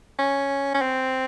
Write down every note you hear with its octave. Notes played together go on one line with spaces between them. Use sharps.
C#4
C#4
C4